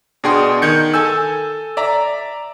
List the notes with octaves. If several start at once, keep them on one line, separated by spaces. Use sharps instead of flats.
B2 D4 G#4 G5 C6
D#3 G6 G#6 C#7
A4 G#5 E6
D5 E5 A#5